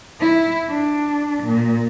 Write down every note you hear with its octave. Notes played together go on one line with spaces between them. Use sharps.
E4
D4
A#2